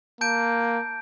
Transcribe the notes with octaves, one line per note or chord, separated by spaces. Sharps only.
A#3 A5 G6 D7